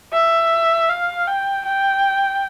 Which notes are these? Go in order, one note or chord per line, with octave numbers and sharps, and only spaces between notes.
E5
F5
G5
G5